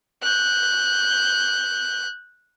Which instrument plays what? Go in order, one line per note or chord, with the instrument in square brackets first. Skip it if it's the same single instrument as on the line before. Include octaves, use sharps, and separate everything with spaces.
[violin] F#6 G6